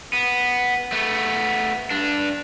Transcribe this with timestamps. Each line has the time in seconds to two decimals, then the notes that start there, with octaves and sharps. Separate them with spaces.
0.13 B3
0.92 A3 B3
1.90 G2 D4